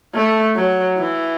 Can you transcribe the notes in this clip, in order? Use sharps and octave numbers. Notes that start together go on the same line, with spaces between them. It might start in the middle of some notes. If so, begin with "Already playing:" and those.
A3
F#3
E3